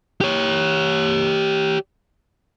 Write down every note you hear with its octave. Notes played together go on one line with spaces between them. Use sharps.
G4 C#5